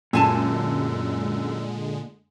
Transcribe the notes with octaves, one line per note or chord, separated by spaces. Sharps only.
F#2 A#2 D3 G#3 A3 G#5 A5